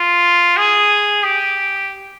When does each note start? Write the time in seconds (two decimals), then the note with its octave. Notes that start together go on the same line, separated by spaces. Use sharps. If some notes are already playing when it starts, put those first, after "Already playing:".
Already playing: F4
0.57 G#4
1.24 G4